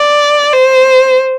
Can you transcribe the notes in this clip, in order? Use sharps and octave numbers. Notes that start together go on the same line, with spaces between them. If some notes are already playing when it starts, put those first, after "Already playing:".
Already playing: D5
C5